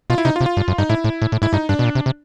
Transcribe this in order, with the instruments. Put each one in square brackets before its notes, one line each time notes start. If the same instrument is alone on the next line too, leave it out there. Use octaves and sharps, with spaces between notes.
[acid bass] B2 [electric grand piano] F4
[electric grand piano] E4
[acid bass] C3 [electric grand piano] D#4
[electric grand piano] F4
[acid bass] C3
[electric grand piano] F4
[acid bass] G2
F#2
[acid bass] G2 [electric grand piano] D#4
[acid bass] A2 [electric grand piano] E4
[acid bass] A2
A2
A2
[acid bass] G#2 [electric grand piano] E4
[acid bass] G2 [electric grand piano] D#4
[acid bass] G2 [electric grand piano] D4
[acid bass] B2
A#2
C3
C3